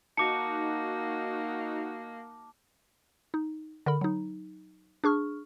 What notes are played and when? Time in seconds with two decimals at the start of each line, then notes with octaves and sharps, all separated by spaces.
0.17 A#3 D#4 F#4 A5 D6 C#7
3.34 D#4
3.86 D3 A#4 B5
4.01 F#3 D#4
5.04 D4 G#4 C#6 F6